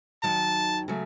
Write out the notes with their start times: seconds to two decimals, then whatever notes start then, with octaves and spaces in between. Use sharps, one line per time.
0.23 D#2 D#3 F#3 A5
0.88 C#3 F#3 A3